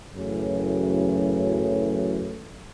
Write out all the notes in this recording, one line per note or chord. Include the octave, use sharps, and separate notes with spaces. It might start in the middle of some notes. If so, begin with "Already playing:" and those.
F#2 A2 C#3 E3 F#3 A3